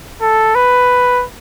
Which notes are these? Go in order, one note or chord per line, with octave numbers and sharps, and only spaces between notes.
A4
B4